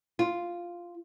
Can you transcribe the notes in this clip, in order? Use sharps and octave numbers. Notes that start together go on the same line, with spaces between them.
F4